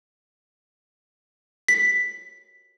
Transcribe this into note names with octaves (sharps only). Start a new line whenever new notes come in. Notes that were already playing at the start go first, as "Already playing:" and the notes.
B6